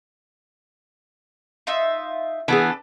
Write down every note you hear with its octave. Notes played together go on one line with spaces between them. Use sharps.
D#4 F4 E5
E3 B3 D4 G#4 A4 B4